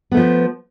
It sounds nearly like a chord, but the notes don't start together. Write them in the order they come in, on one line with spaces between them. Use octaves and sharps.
B3 A3 F3